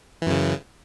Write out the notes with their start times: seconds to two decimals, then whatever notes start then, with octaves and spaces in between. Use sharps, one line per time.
0.22 E3
0.26 F#2
0.31 C#3